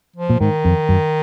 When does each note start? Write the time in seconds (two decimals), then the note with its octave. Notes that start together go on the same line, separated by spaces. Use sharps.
0.16 F3
0.30 A#2
0.40 G#2 D#3
0.65 F2
0.89 F#2